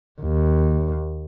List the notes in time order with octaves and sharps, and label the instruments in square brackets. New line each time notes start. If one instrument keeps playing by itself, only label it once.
[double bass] D#2